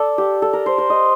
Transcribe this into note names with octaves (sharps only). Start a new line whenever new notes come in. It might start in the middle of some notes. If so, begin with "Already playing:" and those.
Already playing: A4 D5
G4
A4
A#4
C5
C5
D#5